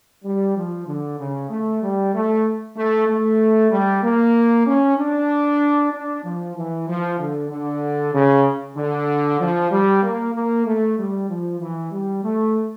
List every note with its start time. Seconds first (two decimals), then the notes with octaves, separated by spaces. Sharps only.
0.25 G3
0.57 F3
0.88 D3
1.20 C#3
1.50 A3
1.82 G3
2.14 A3
2.77 A3
3.09 A3
3.71 G3
4.03 A#3
4.67 C#4
4.98 D4
5.93 D4
6.25 F3
6.56 E3
6.88 F3
7.19 D3
7.50 D3
8.14 C#3
8.77 D3
9.40 F3
9.72 G3
10.03 A#3
10.34 A#3
10.66 A3
10.98 G3
11.30 F3
11.61 E3
11.92 G3
12.24 A3